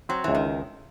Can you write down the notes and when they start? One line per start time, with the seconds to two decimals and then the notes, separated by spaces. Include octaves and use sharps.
0.09 F#3 C4
0.24 C#2 E3
0.35 D#3